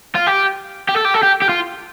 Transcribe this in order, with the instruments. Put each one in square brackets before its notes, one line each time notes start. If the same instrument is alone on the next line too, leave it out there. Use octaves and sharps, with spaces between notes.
[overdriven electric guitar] F4
G4
G4
A4
G4
A4
G4
G4
F4